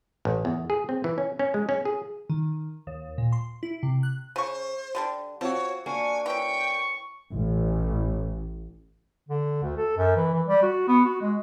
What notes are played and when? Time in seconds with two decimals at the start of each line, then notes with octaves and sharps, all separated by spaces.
0.25 A1
0.45 E2
0.70 G#4
0.89 C4
1.04 E3
1.18 C#4
1.39 C#4
1.54 G#3
1.69 C#4
1.85 G#4
2.30 D#3
2.87 D#2
3.18 A#2
3.33 C6
3.63 E4
3.83 C3
4.03 F#6
4.36 C#3 C5 C#6
4.95 D3 G3 D4
5.41 F3 C4 F#4 C#5
5.86 A#3 D4 F#4 G#5 C#6
6.26 E3 C#4 G5 C#6
7.31 A1
9.29 D3
9.63 D2
9.77 A4
9.97 F#2
10.16 E3
10.34 E3
10.47 G3
10.62 F#4
10.88 B3
11.04 F#4
11.21 G#3